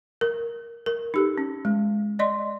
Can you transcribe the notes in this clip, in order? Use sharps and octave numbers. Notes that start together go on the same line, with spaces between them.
A#4
A#4
D#4 G4 A4
C#4
G#3
D5 D#5 C6